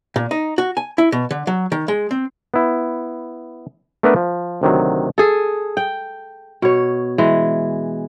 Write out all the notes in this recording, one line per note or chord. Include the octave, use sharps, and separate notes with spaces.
A#2
D#4
F#4
G#5
E4
B2
D3
F#3
D#3
G#3
C4
B3 E4
A3 B3 D4 A#4 B4 E5
F3
D2 C3 D#3 F#3
G#4 A4
G5
B2 C#5
E3 G#3